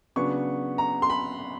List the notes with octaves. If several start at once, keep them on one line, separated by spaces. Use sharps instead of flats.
C#3 F#3 B3 D4 C#6
A#5
C6
B5